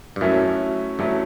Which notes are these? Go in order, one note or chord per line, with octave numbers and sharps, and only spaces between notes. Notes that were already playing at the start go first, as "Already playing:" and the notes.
G2
F#2 F#3 A3 C#4 E4
G2 F#3 A3 C#4 E4